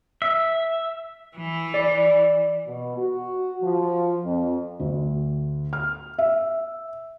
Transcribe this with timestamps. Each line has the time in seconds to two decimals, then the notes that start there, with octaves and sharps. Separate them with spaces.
0.22 E5
1.37 E3
1.74 D5
2.66 B2
2.97 F#4
3.62 F3
4.24 F2
4.80 D2
5.73 F6
6.18 E5